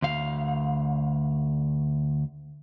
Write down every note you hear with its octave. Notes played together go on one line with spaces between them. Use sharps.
D2 F5